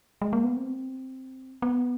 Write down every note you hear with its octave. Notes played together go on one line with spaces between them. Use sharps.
G#3
A#3
B3
C4
B3